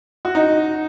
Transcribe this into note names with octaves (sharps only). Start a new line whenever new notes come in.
F#4
D#4